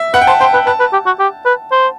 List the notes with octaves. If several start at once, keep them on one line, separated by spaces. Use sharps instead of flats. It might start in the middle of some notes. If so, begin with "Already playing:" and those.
Already playing: E5
B4 F#5
G5
C5 A5
C5 G5
B4 G5
B4 A5
B4
G4
F#4
G4
B4
C5